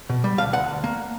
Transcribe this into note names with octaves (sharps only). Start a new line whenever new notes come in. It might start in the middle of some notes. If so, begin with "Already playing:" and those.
B2
G3
D2 F5
D2 F#5
D2
A#3